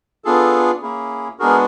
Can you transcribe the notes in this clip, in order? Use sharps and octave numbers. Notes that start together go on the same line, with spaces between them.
B3 D4 F4 G#4 A4
A#3 C#4 E4 G#4
G#3 B3 D4 F#4 G#4 A#4